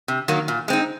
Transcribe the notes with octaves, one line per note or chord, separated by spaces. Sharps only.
C3
D#3 F#3 A#3
A#2
G#3 C4 D#4